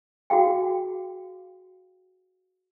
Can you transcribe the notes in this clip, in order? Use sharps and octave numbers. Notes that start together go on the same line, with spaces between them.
F#4 G#4 F5 G5